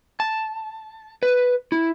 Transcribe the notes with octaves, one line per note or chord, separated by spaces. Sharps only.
A5
B4
E4